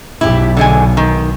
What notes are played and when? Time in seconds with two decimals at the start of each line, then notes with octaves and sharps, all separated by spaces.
0.21 B1 E4 G4
0.57 D3 G#3 G#5
0.97 D#3